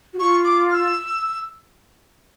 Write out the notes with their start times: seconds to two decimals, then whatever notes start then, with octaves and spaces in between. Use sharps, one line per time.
0.13 F#4
0.20 F4 C#6
0.44 D6
0.70 F6
0.74 E6